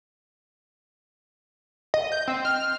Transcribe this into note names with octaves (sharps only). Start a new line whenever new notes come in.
D#5
G6
C4
F6